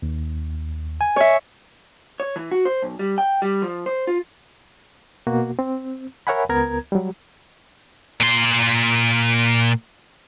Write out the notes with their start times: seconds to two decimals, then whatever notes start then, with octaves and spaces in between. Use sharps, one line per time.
0.02 D#2
1.01 G#5
1.16 C#5 E5
2.20 C#5
2.36 E3
2.51 F#4
2.65 C5
2.82 B1
2.99 G3
3.18 G5
3.42 G3
3.62 F3
3.86 C5
4.07 F4
5.27 B2 A#3 F#4
5.59 C4
6.27 A#4 C#5 E5 F#5 G#5 B5
6.49 C#2 B3 A#4 A#5 G#6
6.92 F#3 G3
8.20 A#2 C6